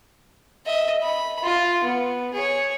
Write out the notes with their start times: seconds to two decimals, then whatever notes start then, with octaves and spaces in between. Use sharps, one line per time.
0.66 D#5 E5
1.02 B5
1.43 F4
1.83 B3
2.34 G#4 C#5